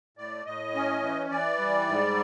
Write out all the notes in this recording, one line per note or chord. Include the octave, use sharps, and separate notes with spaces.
A2 D5
A2 D#5
C#4
E3
E3 D5
G3
G#2